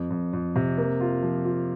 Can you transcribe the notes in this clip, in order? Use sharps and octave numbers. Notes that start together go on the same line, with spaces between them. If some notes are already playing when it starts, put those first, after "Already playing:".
Already playing: F2
F2
F2
C3
A#3
F4
F3
F4